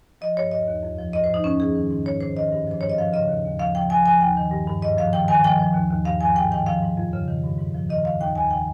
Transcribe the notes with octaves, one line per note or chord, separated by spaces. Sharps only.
F3 D#5
G2 C#5
D#2 D#5
D#2
F2
F3
G#2 D#5
C5
F3 D#4
F2 C#4
F3 G#4
D#3
G#2
D#3 C#5
D#3 C5
D#3 D#5
G2
F3 C5
G#2 C#5
D#5
F3 F5
C#3 D#5
D#2
D#2
F3 F5
F3 G5
F3 G#5
F3 G#5
D#2 G5
D#3
G2
G2
G#2 D#5
F3 F5
D#3 G5
D#3 G#5
F3 G5
F3
D#2
D#2
G2 F5
F3 G#5
G#2 G5
D#3 G5
F3 F5
G#2
F2
C#3
D#3
G2
G#2
F3
D#3 D#5
D#3 F5
D#2 G5
D#2 G#5
D#3 G5